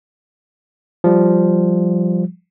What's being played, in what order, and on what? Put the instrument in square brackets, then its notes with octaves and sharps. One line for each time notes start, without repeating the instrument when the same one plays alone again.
[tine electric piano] F3 G3